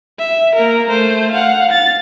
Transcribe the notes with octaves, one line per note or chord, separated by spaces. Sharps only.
E5
A#3 A#4
A3 C5
F5 F#5
A6